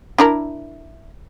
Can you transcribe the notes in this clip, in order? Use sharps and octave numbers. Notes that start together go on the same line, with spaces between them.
D4 E4 A#4